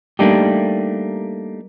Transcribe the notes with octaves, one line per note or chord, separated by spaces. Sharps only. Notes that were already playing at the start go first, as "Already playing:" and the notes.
G3 A3 A#3 D4 D#4 G4